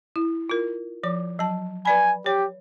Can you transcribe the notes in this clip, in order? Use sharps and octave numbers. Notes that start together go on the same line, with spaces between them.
E4
F4 A#4
F3 C#5 D6
F#3 A5
B4 D5 G#5 B5
G4 C#5